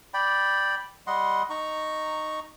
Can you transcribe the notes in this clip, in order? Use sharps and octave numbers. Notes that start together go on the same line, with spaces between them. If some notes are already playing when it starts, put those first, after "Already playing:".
D5 G5 B5
G3 D#5 F#5 C6
D#4 A#5 C#6